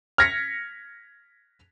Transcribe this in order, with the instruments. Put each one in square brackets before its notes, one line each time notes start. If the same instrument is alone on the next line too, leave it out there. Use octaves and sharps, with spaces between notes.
[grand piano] F6 G#6 A#6 B6 C#7